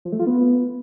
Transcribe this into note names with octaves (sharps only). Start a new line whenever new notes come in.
F3
A3
F4
B3